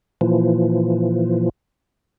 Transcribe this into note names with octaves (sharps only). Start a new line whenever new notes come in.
A#2 E3 F3